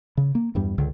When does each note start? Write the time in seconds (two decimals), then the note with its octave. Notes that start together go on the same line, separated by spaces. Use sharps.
0.17 C#3
0.35 A#3
0.55 E2 G2 G3
0.78 C#2 D3